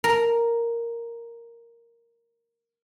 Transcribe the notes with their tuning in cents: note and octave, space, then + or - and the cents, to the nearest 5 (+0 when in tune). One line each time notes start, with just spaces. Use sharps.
A#4 +0 A#5 +0